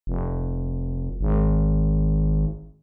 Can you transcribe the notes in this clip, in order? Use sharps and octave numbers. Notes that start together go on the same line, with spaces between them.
F1
G#1